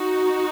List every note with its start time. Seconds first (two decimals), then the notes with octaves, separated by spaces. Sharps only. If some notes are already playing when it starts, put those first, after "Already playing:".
Already playing: D#4 F#4